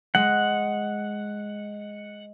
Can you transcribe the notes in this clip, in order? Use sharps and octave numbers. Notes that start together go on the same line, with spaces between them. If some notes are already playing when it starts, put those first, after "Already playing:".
G#3 F#5